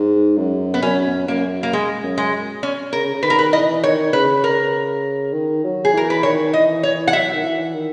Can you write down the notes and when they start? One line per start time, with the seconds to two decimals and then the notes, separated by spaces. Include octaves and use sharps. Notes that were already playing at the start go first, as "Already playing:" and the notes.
Already playing: G#2
0.37 F#2
0.74 B3
0.82 F#2 C#4
1.27 F#2 A#3
1.63 A#3
1.73 G#3
2.03 F#2
2.18 G#3
2.63 C#4
2.92 C#3 A#4
3.14 C#3
3.23 D#3 B4
3.30 A#4
3.39 B4
3.53 E3 D#5
3.83 D#3 C#5
4.13 C#3 B4
4.44 A#4
5.33 D#3
5.64 F#3
5.85 G#4
5.93 E3 A#4
6.10 B4
6.23 D#3 C#5
6.53 E3 D#5
6.83 E3 C#5
7.07 F#5
7.13 F#3 E5
7.34 D#3
7.43 E3
7.74 D#3